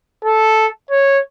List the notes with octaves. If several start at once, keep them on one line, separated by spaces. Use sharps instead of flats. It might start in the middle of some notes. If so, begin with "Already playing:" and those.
A4
C#5